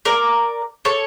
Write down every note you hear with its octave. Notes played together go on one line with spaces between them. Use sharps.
A#4 D5
A4 C#5